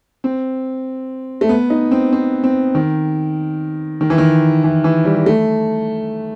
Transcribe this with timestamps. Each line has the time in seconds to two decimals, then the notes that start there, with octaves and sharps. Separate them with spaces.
0.24 C4
1.41 A3
1.49 B3
1.70 D#4
1.91 C4
2.13 C4
2.44 C4
2.75 D#3
4.01 D#3
4.10 E3
4.18 D#3
4.64 E3
4.84 E3
5.05 G3
5.17 G3
5.26 A3